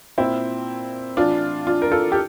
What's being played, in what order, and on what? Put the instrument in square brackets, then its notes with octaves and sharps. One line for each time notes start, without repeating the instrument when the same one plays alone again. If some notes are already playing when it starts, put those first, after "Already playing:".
[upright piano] A#2 C4 E4
A2 E3 D4 F4
D4 F4
A#4
F4 A4
G4